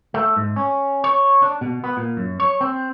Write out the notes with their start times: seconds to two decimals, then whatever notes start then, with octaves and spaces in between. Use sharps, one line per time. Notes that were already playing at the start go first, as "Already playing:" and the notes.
0.14 A3
0.37 G#2
0.56 C#4
1.04 C#5
1.42 D4
1.61 B2
1.84 B3
1.97 A#2
2.17 F#2
2.40 C#5
2.61 C4